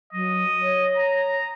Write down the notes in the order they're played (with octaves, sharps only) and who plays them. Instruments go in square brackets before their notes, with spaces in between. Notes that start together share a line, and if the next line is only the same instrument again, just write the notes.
[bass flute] F#3 [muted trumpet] D#5
[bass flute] C#5
[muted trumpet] A#5